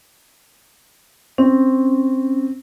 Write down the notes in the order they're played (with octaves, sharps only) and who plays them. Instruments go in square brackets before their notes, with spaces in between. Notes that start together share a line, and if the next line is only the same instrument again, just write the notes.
[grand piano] C4 [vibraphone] C#4